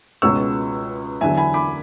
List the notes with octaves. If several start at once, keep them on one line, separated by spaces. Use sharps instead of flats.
C#2 B2 G#3 C#4 C#6 E6
E2 D3 F#3 E5 G#5
G#5 B5
B5 D6